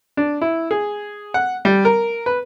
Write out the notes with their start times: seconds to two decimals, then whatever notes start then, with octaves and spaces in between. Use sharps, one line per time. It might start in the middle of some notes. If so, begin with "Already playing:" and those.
0.17 D4
0.41 E4
0.71 G#4
1.34 F#5
1.65 G3
1.85 A#4
2.26 B4